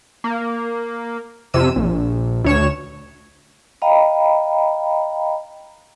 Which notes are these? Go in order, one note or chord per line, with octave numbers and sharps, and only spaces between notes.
A#3
F2 C3 E6 D#7
A#1
D2 C#5 E7
D#5 F5 G5 A#5 B5